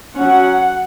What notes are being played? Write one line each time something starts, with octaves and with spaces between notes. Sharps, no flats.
F#3 C#4 F#5